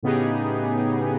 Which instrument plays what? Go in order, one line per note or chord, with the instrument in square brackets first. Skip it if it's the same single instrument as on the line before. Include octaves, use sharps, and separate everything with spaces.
[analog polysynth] A2 C#3 B3 D#4 G4 G#4